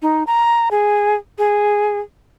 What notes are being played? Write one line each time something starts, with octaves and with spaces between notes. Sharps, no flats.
D#4
A#5
G#4
G#4